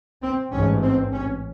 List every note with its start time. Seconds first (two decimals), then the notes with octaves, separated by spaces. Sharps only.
0.22 C4
0.52 A1 G#2 C#4
0.83 C4
1.13 C#4